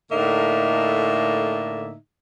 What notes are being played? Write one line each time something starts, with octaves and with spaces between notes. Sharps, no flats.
A2 D3 A#3 D#4 E5